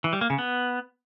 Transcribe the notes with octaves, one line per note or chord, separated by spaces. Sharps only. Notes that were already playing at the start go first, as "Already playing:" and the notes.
E3
G3
A#3
C#3
B3